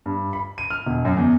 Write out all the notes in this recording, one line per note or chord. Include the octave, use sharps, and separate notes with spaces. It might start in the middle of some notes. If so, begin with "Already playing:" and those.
G2
B5
D#7
F6
E1
F#2
E2